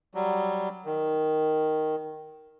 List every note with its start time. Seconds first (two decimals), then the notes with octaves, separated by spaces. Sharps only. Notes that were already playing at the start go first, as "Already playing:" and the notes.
0.15 F#3 G3
0.85 D#3